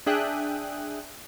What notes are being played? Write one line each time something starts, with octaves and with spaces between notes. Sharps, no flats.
D4 G#4 E5 G5 D#6 F#6